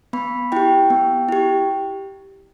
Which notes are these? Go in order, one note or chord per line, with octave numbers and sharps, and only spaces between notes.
B3 B5
E4 G4 G5
B3
E4 G4